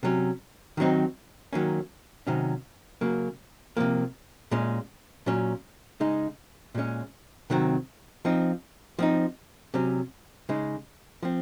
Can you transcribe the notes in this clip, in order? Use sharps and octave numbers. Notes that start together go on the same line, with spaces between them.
C3 F#3 C#4
D#3 F#3 C4 D#4
D#3 F#3 A#3 C#4
C3 D#3 F#3 C#4
C#3 F#3 A#3
C3 F3 A#3
A#2 G#3 C#4
A#2 F#3 C#4
C#3 G#3 D#4
A#2 G#3 C#4
C3 D#3 F#3 C4
F3 C4 D#4
F3 C4 D#4
C3 F#3 C#4
C#3 G#3 D#4
F3 C4